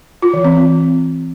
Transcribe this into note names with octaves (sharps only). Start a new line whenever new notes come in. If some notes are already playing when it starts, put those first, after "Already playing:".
F4
E3
C4